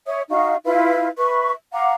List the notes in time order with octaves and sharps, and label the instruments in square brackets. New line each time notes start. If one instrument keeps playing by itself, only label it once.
[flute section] C#5 E5 D#6
D#4 F#4 F5 C#6
E4 F4 B4 F5
B4 E5 C#6
F5 F#5 A#5 D6